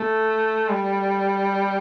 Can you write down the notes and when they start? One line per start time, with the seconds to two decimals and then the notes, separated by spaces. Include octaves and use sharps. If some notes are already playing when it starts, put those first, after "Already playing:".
Already playing: A3
0.69 G3